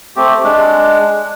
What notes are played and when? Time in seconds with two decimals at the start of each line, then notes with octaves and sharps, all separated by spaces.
0.16 A3 C4 G4
0.44 G#3 D4